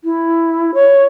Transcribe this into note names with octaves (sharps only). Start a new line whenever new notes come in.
E4
C#5